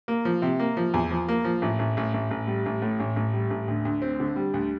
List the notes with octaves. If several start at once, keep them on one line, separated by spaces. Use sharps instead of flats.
A#3
F3
C3
A#3
F3
E2
F3
A#3
F3
A1
A1
A1
A1
A1
G3
A1
A2
A1
A1
G3
A1
D2
D2
C4
D3
G3
D2